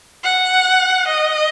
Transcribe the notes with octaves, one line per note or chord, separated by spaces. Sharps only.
F#5
D#5